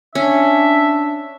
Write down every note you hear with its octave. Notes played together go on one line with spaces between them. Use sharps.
C#4 D4 E5